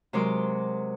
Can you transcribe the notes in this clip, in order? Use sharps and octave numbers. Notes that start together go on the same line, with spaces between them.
C3 F#3 G#3 A#4 C6 D6